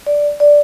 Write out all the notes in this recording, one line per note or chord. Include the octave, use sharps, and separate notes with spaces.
D5
D5